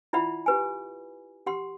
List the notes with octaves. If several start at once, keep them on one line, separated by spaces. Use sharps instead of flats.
E4 F4 D5 E5 F#5 B5
G4 B4 G#5
G4 F#5 C6